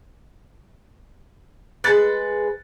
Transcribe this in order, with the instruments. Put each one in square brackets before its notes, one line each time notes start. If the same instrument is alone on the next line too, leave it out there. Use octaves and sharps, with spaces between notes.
[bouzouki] G#3 B4 [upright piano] F#6 A6 C#7